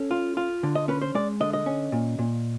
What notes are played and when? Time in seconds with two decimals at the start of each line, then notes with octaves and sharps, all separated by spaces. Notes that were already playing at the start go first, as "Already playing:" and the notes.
Already playing: C#4 A4
0.11 F4
0.37 F4
0.63 D3
0.75 D#5
0.88 C#4 B4
1.02 C5
1.15 G#3 D5
1.40 D3 D#5
1.53 D#5
1.66 C#4
1.92 A#2
2.19 A#2